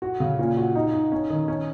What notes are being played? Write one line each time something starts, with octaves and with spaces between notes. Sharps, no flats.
F#4
C#3
A#2
F#4
D#4
D#4
C#4
D#3
C#4